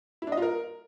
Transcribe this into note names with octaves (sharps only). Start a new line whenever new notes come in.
E4
D4
D#5
F4
A#4